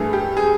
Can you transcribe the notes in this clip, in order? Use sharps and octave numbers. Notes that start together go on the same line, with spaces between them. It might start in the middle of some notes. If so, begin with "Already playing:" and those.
Already playing: G2 E3 A3 G#4
G4
G#4